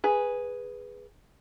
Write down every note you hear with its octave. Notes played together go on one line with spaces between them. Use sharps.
G#4 B4